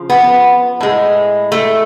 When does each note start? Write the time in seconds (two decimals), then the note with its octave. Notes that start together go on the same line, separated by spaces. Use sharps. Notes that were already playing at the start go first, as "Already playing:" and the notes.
Already playing: C#3 F3
0.10 B3
0.81 A2 G#3
1.52 A3